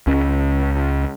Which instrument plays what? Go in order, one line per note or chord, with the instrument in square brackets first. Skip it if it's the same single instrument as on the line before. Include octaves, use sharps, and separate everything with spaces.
[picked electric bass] C#2 C#4